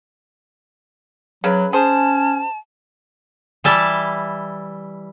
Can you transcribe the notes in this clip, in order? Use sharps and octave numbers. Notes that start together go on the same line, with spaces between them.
C#3 F#3 B4
C#4 G#4 C5 A5
E3 G3 E4 A5